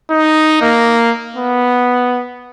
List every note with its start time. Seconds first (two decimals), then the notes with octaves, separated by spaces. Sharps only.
0.11 D#4
0.62 A#3
1.36 B3